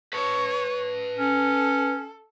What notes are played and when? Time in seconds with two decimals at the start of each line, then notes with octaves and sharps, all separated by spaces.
0.13 B4 C#5 A5
1.18 C#4 A4